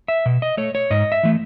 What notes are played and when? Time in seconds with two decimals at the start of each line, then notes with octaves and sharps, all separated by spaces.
0.08 E5
0.26 B2
0.42 D#5
0.57 A3 C#5
0.75 C#5
0.90 G#2 D#5
1.12 E5
1.23 E3 A3